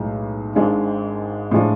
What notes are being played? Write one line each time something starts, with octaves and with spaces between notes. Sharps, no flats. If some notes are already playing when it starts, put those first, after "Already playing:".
Already playing: B1 A2 G#3
G#1 G#2 G#3 D4 F4
A2 F3 G#3 D4 F4